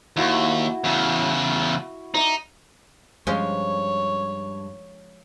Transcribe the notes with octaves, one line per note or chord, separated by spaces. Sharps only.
D#2 E4 F#4
E2 C#3
D#4 D5 E5
G2 F3 G#3 C#4 C#5